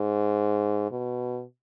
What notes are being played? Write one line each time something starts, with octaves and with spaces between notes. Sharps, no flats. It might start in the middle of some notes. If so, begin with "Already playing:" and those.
Already playing: G#2
B2